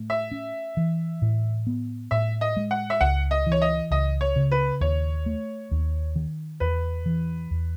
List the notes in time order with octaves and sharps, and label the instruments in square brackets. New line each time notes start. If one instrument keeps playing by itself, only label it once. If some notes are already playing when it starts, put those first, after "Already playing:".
Already playing: [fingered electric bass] A2 A3
[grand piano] E5
[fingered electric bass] C#4
E3
A2
B3
[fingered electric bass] A2 [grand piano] E5
[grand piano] D#5
[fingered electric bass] G#3
[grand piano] F#5
E5
[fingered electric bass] C#2 [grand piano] F#5
[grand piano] D#5
[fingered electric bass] E3
[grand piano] C#5
D#5
[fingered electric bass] C#2 [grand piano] D#5
[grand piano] C#5
[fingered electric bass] C#3
[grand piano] B4
[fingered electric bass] D#2 [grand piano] C#5
[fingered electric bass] A3
D#2
D#3
[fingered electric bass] E2 [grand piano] B4
[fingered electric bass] E3
E2